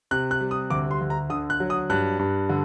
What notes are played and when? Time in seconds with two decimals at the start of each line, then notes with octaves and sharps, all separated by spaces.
0.11 C3 F#6
0.31 F#6
0.40 G3
0.51 D#6
0.70 D2 D6
0.91 C6
1.01 D2
1.10 A#5
1.30 D3 D#6
1.50 F#6
1.60 F#3
1.70 D#6
1.90 G2 F#6
2.19 G2
2.49 D3